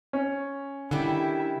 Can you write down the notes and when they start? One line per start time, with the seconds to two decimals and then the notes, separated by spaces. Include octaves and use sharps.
0.13 C#4
0.91 D3 D#3 G3 E4 G4